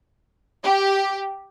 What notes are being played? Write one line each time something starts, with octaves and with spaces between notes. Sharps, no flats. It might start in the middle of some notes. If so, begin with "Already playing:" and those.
G4